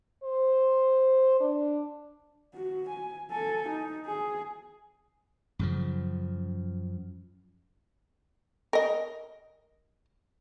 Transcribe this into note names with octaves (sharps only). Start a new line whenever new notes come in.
C5
D4
F#4
G#5
A4 G#5
D#4
G#4
F#2 C#3 F3
A#4 D#5